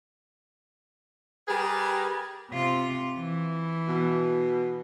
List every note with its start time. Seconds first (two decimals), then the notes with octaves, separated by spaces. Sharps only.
1.48 G3 G4 G#4 A#4 B4
2.51 C3 F4
3.17 E3
3.88 B2